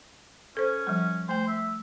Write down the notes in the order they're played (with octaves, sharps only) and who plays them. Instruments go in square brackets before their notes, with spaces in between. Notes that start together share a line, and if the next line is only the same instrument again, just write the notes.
[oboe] C#4 [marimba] A4 C5
[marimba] F3 G3
[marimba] A3 G5 [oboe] C5
[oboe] E5